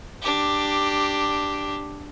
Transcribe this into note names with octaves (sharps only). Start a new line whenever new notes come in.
D4 G4